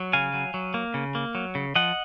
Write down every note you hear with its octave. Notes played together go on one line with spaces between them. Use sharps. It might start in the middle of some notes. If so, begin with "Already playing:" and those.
Already playing: F#3
C#3 F5 G#5
F#3
F#3
A#3
C#3
A#3
F#3
C#3
F3 D#5 F#5